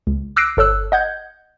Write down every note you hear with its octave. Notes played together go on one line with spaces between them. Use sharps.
C#2
D6 E6 F#6 A#6 C7 D7
G1 A4 C#5 E6 F#6
D#5 F#5 G6 G#6